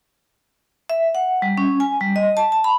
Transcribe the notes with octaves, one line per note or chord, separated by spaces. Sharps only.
E5
F#5
G3
C#4
G#5
G3
D#5
A5
A5
B5